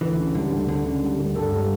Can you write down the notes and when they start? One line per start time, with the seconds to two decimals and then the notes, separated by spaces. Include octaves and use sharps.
0.01 D2 E3
0.18 C#3
0.34 D3 G3
0.52 D2
0.68 D2 D3
0.85 C#3
1.02 G3
1.18 D2
1.35 G2 A4
1.52 G3